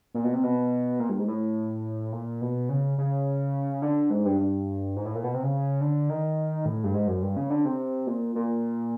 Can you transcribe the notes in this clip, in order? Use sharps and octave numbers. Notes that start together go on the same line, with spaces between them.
A#2
B2
C3
B2
A#2
G2
G#2
A2
A#2
B2
C#3
C#3
D3
G#2
G2
G2
G#2
A2
A#2
B2
C3
C#3
D3
D#3
A2
G2
G#2
F#2
G2
C#3
D3
C3
A#2
A#2